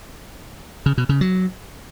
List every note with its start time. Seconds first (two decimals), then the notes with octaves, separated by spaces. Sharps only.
0.86 C#3
0.98 B2
1.09 C#3
1.21 F#3